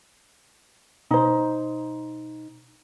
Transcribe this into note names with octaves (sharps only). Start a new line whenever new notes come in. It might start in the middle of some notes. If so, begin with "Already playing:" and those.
B2 D#4 C5